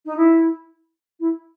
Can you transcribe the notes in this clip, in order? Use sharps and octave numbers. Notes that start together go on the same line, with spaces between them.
D#4
E4
E4